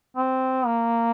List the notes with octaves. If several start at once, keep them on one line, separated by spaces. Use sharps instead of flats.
C4
A#3